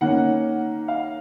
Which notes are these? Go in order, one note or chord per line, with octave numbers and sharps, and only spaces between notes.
D#3 A#3 C#4 F#5
F5